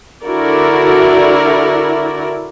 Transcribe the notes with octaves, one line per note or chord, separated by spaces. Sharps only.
D3 E4 F#4 A#4 D5